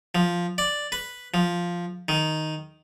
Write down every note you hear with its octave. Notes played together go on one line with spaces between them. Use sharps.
F3
D5
B4
F3
D#3